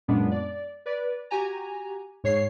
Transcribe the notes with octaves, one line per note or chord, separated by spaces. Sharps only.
F#2 A#2 G#3 B3 D4
D5
B4 D5
F#4 G4 G#5 A#5
G#2 C#5 C7